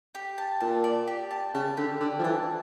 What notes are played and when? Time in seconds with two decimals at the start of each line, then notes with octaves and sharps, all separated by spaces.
0.15 G4
0.38 A5
0.61 A#2 A5
0.84 D5
1.08 G4
1.31 A5
1.54 C#3 A5
1.77 D3 G4
2.00 D3 D5
2.19 F3
2.23 E3 A5